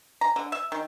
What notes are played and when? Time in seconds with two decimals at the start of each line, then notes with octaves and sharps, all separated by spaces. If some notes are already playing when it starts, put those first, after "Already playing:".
0.21 A#5
0.36 D3
0.52 E5
0.72 D#3